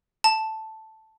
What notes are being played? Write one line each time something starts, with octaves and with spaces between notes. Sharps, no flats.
A5